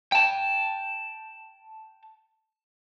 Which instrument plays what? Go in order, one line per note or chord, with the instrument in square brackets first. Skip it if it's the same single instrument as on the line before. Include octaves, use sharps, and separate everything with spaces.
[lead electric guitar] G5 A5